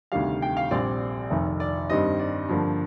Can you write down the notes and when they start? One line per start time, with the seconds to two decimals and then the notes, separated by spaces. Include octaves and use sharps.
0.12 D2 C3 D#3 G3 F5
0.42 G5
0.57 F5
0.71 A#1 A#2 G3 C4 D5
1.30 F1 F2 D#3
1.60 D5
1.90 G2 D#3 G3 C4 D#5
2.19 D5
2.49 G2 D3 F3 A#3